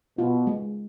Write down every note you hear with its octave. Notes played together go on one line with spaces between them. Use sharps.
B2 F4
G#3